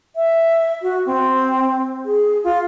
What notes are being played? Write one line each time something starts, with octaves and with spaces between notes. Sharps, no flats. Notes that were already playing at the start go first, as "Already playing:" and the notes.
E5
F#4
C4
G#4
F4